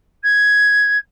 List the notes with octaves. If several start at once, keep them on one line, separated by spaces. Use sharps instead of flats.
G#6